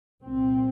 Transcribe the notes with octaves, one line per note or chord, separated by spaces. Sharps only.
C2 A#2 C4